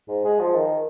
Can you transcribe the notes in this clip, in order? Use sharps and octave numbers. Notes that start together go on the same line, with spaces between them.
G#2
G#3
F3
D#3